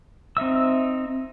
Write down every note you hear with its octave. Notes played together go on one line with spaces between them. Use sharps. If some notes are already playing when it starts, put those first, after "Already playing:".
C4 D#4 E5 E6